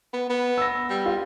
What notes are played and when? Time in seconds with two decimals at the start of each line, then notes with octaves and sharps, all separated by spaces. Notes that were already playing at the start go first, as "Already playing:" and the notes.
0.13 B3
0.30 B3
0.58 E6 A#6
0.89 G3
1.06 F4